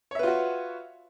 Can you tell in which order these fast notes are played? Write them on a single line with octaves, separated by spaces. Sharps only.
C#5 E5 B4 F4 F#4